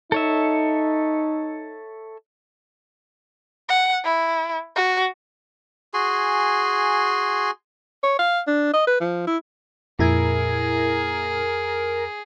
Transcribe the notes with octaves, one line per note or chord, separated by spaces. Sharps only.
D#4 A4 C#5 E5
F#5
E4
F#4
F#4 G#4 G#5 C6
C#5
F5
D4
D#5
B4
F3
E4
F2 A#2 E4 G#4 A#4 G#6